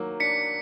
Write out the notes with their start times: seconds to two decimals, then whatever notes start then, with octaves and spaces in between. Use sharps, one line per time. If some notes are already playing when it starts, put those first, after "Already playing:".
Already playing: D#3 F#3 A#3
0.20 D4 B6 C#7